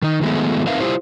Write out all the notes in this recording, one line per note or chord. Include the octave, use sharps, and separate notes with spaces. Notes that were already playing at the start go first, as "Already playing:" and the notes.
D#3 D#4
D#3 F3 G#3 A3 B3
C4 D#4 A#4 B4 E5 F5
E4 F4 G4 C5